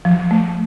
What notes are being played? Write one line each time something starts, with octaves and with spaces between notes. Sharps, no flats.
F3
A3